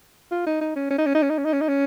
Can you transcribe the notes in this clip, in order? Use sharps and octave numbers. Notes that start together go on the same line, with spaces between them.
F4
D#4
D#4
C#4
C#4
D#4
C#4
D#4
C#4
D#4
C#4
D#4
C#4
D#4
C#4